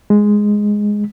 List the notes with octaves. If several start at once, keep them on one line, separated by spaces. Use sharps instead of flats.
G#3